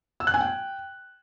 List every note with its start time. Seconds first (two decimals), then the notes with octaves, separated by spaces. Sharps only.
0.20 E6
0.27 F#6
0.34 G#5
0.41 G5